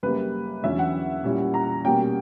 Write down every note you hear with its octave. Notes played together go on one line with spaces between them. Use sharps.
F#2 C#3 G3 A#3 B4
E2 D3 F#3 C#4 E4 E5
F#5
A#2 G3 C#4 E4
A#5
B2 G3 A#3 C#4 G5